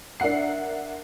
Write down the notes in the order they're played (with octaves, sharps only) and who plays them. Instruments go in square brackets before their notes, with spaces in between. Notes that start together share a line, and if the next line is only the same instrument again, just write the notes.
[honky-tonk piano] D4 A#4 E5 F#5 C7